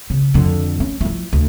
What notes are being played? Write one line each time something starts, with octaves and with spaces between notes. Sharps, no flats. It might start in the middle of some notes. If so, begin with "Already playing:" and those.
C#3
F2 D3
C#4
F3 E4
D2